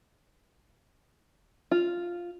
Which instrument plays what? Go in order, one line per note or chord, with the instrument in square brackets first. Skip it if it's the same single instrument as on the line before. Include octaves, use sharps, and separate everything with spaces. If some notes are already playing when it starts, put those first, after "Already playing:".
[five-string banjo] F4